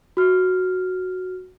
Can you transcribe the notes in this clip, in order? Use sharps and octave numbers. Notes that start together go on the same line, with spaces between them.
F#4 F6